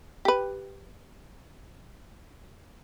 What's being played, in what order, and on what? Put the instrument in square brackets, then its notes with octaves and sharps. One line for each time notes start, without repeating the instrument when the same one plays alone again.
[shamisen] G4 B4